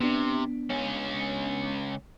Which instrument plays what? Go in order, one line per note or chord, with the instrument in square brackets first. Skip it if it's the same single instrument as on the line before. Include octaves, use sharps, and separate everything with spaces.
[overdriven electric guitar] C3 [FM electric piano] B3 D4
[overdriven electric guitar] C#2 C#4